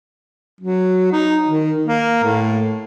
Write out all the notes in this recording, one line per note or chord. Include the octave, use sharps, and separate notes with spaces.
F#3
D#4
D#3
A#3
A2